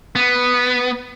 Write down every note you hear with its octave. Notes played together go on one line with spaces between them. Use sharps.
B3